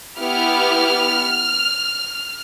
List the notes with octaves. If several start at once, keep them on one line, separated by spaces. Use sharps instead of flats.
B3 E4 G4 F6